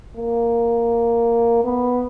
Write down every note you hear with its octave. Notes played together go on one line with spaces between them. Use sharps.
A#3
B3